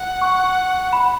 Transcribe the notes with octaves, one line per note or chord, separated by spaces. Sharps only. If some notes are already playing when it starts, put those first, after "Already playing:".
Already playing: F#5
C#6
B5